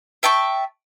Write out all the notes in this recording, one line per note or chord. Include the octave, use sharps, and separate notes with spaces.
E5 G5 A5 C#6